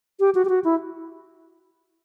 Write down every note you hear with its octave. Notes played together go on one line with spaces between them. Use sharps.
G4
F#4
G4
F#4
E4